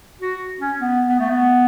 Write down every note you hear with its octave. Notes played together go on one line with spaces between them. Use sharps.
F#4
C#4
B3
B3
A3
B3